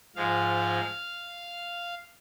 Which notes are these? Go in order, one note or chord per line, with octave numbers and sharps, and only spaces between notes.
G#2 F3 G#3 F5